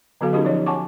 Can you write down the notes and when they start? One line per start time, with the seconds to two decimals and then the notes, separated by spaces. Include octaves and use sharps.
0.21 D3 F#3 B3 F#4 A4 F5
0.33 C#4 D#4 F4 G4 G#4 D#5
0.45 F3 C#5 D#5
0.66 C#5 F#5 G#5 A5 C#6 D6